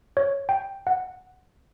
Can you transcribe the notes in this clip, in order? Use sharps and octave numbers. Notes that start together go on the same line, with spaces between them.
C#5
G5
F#5